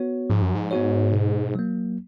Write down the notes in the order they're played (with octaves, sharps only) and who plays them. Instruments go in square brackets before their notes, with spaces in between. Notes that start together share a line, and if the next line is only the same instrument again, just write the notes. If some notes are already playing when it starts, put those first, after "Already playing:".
Already playing: [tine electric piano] B3 F#4 C#5
[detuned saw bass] G#2 [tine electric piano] F3
[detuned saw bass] F#2
G#2
[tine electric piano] B3 F#4 C#5
B2
F#3 A#3